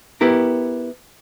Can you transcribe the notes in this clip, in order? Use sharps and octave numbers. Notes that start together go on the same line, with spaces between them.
B3 E4 G4 A#4